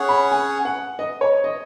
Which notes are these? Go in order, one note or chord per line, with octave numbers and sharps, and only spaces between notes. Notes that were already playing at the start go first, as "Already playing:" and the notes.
Already playing: C#4 G#4 C#5 F#5
B5
G#5
F#5
D#5
C#5
D#5